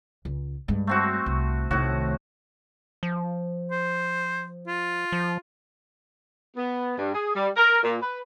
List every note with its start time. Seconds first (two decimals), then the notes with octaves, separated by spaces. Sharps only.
0.25 C#2
0.68 G2 G#3
0.87 A3 C4 F#4
1.26 C2
1.71 C2 A2 D#3 F#4
3.03 F3
3.71 C5
4.68 F4
5.12 F3
6.57 B3
6.98 G2
7.15 G#4
7.36 G3
7.57 A#4
7.83 A#2
8.02 B4